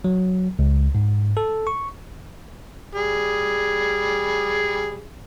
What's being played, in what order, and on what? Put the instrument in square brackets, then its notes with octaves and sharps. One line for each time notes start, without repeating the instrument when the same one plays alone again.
[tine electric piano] F#3
C#2
G#2
A4
C#6
[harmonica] G3 G#4